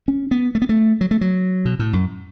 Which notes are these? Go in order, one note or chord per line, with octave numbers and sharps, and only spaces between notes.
C#4
B3
A3
B3
A3
F#3
A3
F#3
B2
A2
F#2